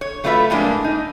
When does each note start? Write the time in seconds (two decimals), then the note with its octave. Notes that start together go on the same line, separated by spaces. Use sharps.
0.01 C#5
0.24 F#3 A3 F4 B4 C#5 E5
0.50 F2 A2 G#3 A#3 D4
0.84 D#4